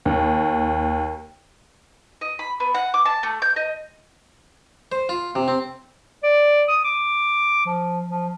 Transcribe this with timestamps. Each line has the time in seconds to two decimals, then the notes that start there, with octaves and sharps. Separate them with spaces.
0.05 D#2
2.21 D#5
2.39 B5
2.60 B3
2.75 F#5
2.94 D6
3.05 A5
3.23 A3
3.42 G6
3.56 D#5
4.92 C5
5.09 F4
5.35 C3
5.48 C4
6.23 D5
6.68 D#6
6.84 D6
7.66 F3
8.07 F3